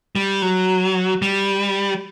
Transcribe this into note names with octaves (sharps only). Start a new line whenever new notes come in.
G3
F#3
G3